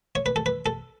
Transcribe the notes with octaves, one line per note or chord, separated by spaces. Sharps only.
C#5
B4
A4
B4
A4